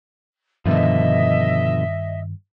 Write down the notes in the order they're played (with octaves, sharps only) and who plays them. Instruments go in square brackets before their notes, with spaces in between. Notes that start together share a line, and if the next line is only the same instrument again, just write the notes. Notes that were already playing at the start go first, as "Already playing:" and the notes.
[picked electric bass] G2 D#3 [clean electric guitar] B2 D3 F3 [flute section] D#5 E5